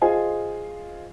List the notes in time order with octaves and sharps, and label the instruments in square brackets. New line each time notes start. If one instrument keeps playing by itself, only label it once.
[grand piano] F4 G#4 C5 D#5 G#5